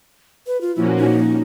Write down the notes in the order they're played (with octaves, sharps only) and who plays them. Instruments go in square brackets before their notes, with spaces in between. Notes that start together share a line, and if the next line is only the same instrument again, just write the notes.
[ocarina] B4
F4
[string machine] A#2 F3 A#3 C#4 F#4 [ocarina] E4
[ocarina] D#4